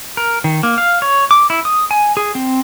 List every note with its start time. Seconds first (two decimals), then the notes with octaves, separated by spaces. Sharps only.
0.17 A#4
0.44 D#3
0.63 A#3
0.78 F5
1.02 C#5
1.31 D6
1.50 E4
1.65 D#6
1.91 G#5
2.17 G#4
2.35 C4